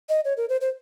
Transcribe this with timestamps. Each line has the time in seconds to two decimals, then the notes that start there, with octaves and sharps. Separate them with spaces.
0.09 D#5
0.25 C#5
0.37 A#4
0.49 C5
0.61 C5